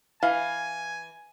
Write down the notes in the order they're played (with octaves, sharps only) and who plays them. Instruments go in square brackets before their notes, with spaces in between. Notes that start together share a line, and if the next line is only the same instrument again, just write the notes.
[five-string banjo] E3 [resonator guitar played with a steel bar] F5 [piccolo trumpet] G#5